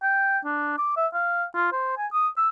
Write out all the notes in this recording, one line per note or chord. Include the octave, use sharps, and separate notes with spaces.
G5
D4
D6
E5
F5
F4
C5
G#5
D#6
E6